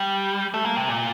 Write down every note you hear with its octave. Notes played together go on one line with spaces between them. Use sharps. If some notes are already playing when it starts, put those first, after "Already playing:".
Already playing: G3
A3
A#3
C3
A#2